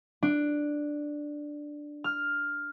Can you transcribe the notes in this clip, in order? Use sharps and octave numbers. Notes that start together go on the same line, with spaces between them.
D4
F6